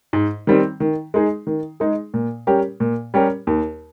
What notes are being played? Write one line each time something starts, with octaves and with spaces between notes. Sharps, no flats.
G#2
D#3 G3 C4
D#3
G#3 D#4 G#4
D#3
G#3 D#4 G#4
A#2
G3 C#4 G4 A#4
A#2
G3 C#4 G4 A#4
D#2